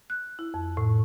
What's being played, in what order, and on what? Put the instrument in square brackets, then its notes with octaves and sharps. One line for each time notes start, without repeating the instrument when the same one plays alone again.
[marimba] F#6
E4
F2
A2